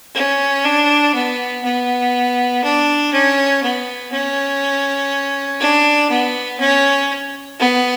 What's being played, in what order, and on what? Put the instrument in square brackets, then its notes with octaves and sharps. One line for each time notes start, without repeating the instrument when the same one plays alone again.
[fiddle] C#4
D4
B3
B3
D4
C#4
B3
C#4
D4
B3
C#4
B3